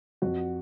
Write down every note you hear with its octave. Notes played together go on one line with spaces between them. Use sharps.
F2 F#4 F#5